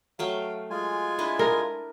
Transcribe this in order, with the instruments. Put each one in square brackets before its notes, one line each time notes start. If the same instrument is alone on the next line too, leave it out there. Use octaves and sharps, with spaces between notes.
[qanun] F#3 A3 G5 [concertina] F5
[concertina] G#3 F4 G#5
[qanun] D4 E4 D#5
[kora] A#4